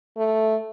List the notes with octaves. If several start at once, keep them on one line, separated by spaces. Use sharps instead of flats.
A3